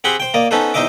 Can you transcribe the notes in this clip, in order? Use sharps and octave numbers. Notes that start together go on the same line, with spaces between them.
C4 G4 G#4 F#5 B5 C6
C5 G5
A#3 D5 D#5
B3 C#4 D#4 A4 B4 C5
E2 D#4 C5 D#5 E5 D6